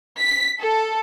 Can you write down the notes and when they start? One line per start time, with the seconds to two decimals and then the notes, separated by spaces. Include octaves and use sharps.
0.20 B6
0.60 A4